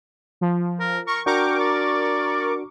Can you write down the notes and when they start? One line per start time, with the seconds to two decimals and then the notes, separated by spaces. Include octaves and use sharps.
0.41 F3
0.80 A#4
1.07 A#4 C#6
1.26 D4 F#4 A#4 G5 C#6 D6
1.59 D5